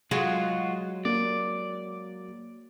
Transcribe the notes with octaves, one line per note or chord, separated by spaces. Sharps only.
F#3 G#3 F4 F#4
A#3 D5